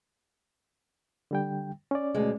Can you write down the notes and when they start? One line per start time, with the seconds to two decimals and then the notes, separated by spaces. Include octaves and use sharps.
1.31 D3 G3 G5
1.91 C#4 D5
2.15 D2 B2 G#3